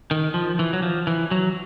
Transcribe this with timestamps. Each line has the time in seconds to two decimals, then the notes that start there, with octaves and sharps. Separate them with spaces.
0.11 D#3
0.34 F3
0.59 E3
0.73 F#3
0.82 F3
1.07 E3
1.31 F#3